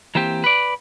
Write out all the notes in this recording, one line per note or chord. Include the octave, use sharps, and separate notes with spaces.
E3 A#3 C4 G4
B4 D5